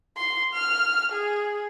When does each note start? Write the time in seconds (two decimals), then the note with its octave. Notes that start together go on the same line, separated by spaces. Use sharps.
0.17 C6
0.54 F6
1.12 G#4